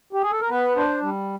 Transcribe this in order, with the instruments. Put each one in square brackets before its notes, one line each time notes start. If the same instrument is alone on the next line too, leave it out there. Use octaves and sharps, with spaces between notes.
[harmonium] G4
G#4
A4
A#4
B3 B4
D4 C5
G3